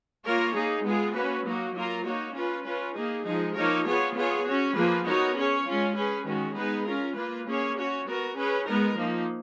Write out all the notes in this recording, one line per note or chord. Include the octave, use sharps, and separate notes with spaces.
A#3 F4 A#4 C#5
A#3 D#4 G#4
G#3 B3 F4 G#4
A#3 C#4 F#4 B4
F#3 A#3 D#4 F#4
F#3 A#3 F4 A#4
A#3 D#4 F#4 C#5
C#4 F4 B4
C#4 F4 B4
A#3 D#4 G#4
F3 G#3 D#4 G#4
F3 A#3 D#4 A#4 C#5
B3 F4 G#4 C#5
B3 F4 G#4 C#5
C#4 F#4 C#5
F3 A#3 F4 G#4 B4
B3 D#4 F#4 A#4 C#5
C#4 G#4 C#5
G#3 C#4 F4
C#4 G#4 B4
D#3 G#3 C#4 F#4
G#3 B3 D#4 G#4 B4
C#4 F4 A#4
A#3 F4 B4
A#3 C#4 G#4 C#5
C#4 F#4 C#5
B3 F#4 A#4
C#4 G#4 B4
G#3 B3 D#4 A#4
F3 A#3 D#4